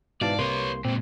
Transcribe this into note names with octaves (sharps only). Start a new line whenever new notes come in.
G#2 B2 E3 D5 F5 A5
C2 C3 A#3 B4 C#5 C6
A#2 G#3 C4